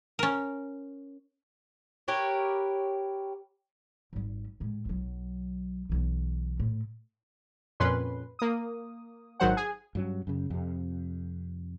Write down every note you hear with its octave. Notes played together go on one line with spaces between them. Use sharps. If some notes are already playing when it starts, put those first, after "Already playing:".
C#4 A#4
G4 A#4 B4 C#5
G#1 G3
A2 G#3
B1 F#3
B1 E3
A2
F2 A#2 C#4 B4 C6
A#3 D#6
G#1 D#3 F#3 C5 F#5
G#4
G2 F#3 C#4
F#2 C#3
F2 C3